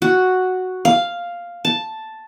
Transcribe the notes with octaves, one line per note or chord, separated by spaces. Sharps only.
F#4
F5
A5